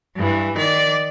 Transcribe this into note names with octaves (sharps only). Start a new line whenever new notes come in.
G2 E3
D#3 D5